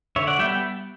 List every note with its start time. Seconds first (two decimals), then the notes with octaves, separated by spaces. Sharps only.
0.16 D3 C#5 E5
0.27 D5 F#5
0.39 G3 B3 E5 G5